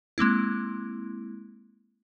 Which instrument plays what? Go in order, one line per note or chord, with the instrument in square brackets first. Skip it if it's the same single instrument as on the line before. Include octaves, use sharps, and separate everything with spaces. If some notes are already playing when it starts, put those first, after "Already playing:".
[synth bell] G#3 A#3 C4 E4